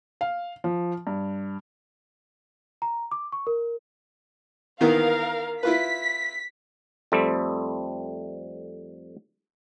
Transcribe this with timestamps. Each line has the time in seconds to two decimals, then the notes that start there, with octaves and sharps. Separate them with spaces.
0.21 F5
0.64 F3
1.07 G2
2.82 A#5
3.12 D6
3.32 C#6
3.47 A#4
4.81 D#3 E3 B3 A#4 F5
5.63 E4 F4 B4 B6
7.12 F2 G3 A3 C4